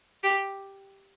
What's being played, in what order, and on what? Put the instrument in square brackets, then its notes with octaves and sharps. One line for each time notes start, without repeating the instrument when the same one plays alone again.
[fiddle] G4